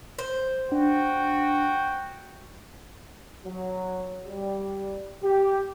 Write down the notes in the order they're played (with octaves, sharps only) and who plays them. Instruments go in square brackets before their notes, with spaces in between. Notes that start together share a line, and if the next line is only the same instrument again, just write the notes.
[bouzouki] C5
[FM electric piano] D4 [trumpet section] F#4 G5
[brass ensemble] F#3
G3
G4